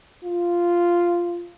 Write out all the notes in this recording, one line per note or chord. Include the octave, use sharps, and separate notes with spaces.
F4